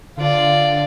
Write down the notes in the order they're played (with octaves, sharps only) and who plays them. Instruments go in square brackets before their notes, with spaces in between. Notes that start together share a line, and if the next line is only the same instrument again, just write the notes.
[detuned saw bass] D3 [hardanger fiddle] F4 D5